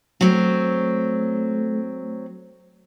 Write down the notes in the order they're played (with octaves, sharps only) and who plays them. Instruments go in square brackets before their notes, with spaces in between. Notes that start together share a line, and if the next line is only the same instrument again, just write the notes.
[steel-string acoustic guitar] F#3 C4 [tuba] A3